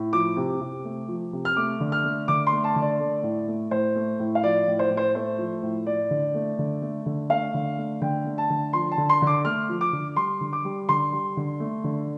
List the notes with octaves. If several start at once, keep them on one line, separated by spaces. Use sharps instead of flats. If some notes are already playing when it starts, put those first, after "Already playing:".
Already playing: A2
F3 D6
C3
C3
A3
F3
C3
F6
A3 D6
D3
F6
A3
D3 D6
C6
A3
A5
D3
D5
A3
A2
A3
A2 C5
A3
A2
F5
F3 D5
A2
C5
A2
C5
A3 C5
F3
A2
A3 D5
D3
A3
D3
A3
D3
A3 F5
D3
A3
D3 G5
A3
A5
D3
F3 C6
A5
D3
C6
D3
D6
A3 F6
F3
D6
D3
G3 C6
D3
D6
G3
D3 C6
G3
D3
A3
D3